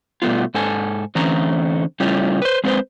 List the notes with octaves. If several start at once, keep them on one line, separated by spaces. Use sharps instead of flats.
B2 G3 A3 B3 F4
G#2 A4 G#5
D3 E3 A3 C4 C#4 A#5
C#3 G3 A3 C#4 E4 F4
B4 C5
G#3 C4 E4 A4 B4 C5